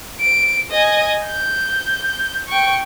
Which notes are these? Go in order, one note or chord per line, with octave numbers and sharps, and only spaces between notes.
D7
D#5 G#5
G6
G5 C#6